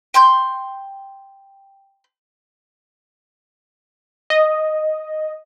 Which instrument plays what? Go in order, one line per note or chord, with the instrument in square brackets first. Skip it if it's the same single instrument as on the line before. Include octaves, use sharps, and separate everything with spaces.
[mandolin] G5 C6 G6
[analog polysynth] D#5